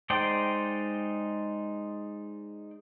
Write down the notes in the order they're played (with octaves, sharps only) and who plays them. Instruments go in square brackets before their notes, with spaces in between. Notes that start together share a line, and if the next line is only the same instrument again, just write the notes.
[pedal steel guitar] G#3 D#4 C5 D5 G5